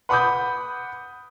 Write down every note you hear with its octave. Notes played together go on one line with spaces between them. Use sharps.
B4 F#5 B5 D6 D#6 G6